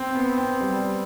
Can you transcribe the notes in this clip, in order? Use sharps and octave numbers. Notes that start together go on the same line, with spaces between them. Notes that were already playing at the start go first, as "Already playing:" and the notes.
Already playing: C4
B3
C4
G3